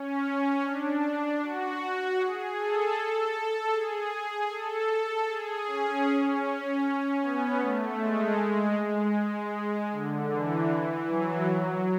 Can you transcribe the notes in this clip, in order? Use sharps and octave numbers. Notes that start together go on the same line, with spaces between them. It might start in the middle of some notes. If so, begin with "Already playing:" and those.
Already playing: C#4
D4
F#4
G#4
A4
G#4
A4
G#4
C#4
B3
A3
G#3
G#3
D3
E3
F#3
F#3